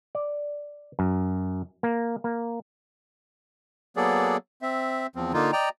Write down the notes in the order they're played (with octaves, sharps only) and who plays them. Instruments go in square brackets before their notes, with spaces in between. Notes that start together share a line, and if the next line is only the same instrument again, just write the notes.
[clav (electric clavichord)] D5
F#2
A#3
A#3
[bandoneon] F#3 A#3 B3 G#4 A4 D5
C4 E5
E2 F3 C4
D3 A#3 D#4 F4
D5 D#5 G5 A#5